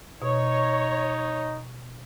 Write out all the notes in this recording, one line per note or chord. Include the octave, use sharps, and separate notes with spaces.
B2 D#4 C#5